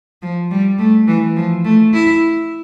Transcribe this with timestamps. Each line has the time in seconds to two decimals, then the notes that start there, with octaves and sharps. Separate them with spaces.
0.22 F3
0.51 G3
0.79 A3
1.07 E3
1.36 F3
1.64 A3
1.93 E4